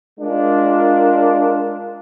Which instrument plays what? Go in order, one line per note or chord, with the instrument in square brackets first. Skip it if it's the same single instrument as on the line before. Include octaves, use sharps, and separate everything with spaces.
[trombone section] G#3 D4 F4 A#4